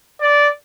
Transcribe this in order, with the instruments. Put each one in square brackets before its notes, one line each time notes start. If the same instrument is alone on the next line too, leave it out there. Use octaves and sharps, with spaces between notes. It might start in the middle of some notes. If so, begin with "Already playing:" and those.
[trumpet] D5